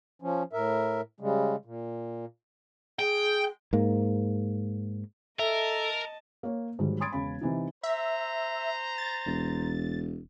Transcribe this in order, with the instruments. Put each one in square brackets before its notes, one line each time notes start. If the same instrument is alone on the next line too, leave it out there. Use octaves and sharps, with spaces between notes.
[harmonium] F3 C#4
A2 A#4 E5
C#3 G3 G#3
A#2
[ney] G#4 [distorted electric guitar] G5
[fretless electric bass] G#2 A#3
[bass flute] A4 [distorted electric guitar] A#4 [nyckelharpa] D#5 A5 [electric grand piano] E5
[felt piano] A#3 C#5
G#2 D#3 F#3 G3
B5 C6 D#6 G#6 A6 D7
E1 C#3 B5
C3 E3 D#4
[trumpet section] C5 A#5 [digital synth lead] E5
[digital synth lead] A6
[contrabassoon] E1